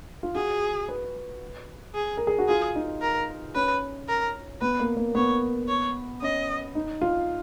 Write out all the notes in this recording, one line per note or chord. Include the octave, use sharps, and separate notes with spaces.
F4
F#4 G#4
B4
G#4
A#4
G#4
F#4
F4 G#4
D#4
A#4
C#4 B4
A#4
B3 B4
A#3
A#3
B3 C#5
C#5
C#4 D#5
D#4
F4